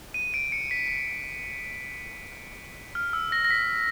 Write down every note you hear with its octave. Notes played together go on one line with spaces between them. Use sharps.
D#7
D7
C#7
B6
F6
E6
A#6
A#6
B6